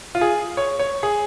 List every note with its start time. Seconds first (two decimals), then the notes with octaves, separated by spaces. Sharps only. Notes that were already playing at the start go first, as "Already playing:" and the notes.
0.15 F4
0.21 G#4
0.57 C#5
0.79 C#5
1.03 G#4